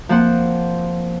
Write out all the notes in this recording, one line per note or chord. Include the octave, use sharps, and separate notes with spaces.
F3 A#3 C4 C5 F#5